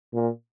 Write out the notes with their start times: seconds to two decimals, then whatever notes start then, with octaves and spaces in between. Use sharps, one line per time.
0.14 A#2